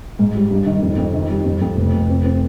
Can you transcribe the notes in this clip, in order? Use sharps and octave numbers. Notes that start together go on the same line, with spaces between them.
G#2
G3
G2
D#3
F2
F2
D#3
G3
F2
F2
F1
F1
C4
C4